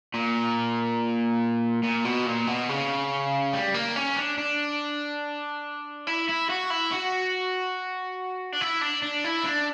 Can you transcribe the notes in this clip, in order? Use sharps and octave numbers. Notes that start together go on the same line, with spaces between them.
A#2
A#2
B2
A#2
B2
C#3
G3
A#3
C#4
D4
D4
E4
E4
F#4
E4
F#4
D4
E4
D4
D4
E4
D4